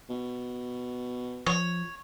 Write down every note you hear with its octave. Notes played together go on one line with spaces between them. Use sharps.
B2
F3 C#5